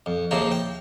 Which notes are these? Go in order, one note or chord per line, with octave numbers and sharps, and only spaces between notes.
F2
D#2 C#3 F3 E4 C5 A#5
G5